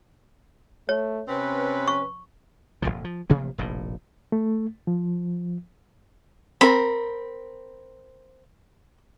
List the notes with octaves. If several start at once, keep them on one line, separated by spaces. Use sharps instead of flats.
A3 C#5
C3 C4 C#4 B4
C#6
F1 B1 A#2 F3
F3
A1 C3 F3 A#3
F1 A#1 A2
A3
F3
C4 A#4 B5